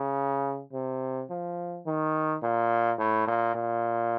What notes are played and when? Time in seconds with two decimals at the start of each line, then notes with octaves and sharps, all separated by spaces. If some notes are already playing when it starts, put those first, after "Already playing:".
Already playing: C#3
0.73 C3
1.30 F3
1.86 D#3
2.43 A#2
2.98 A2
3.27 A#2
3.55 A#2